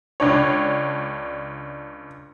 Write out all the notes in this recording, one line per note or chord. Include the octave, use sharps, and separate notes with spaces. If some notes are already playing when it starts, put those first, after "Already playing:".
C#2 D4 C#5